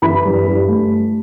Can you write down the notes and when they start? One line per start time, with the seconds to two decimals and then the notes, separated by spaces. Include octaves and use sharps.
0.02 E3 B5
0.25 G2
0.47 G2
0.68 A3